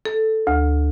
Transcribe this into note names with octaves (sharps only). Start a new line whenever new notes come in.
A4
D2